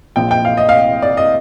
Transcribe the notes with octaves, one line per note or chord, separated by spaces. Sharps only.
A#1 A#2 F3 G5
G5
F5
D#5
F5
D5
D#5